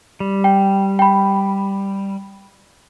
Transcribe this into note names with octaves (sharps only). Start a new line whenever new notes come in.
G3
G5
G5 B5